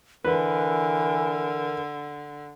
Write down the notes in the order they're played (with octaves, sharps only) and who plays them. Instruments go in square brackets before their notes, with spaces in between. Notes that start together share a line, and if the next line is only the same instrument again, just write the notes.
[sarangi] D3 [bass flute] E3 [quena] A#4 [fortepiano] B4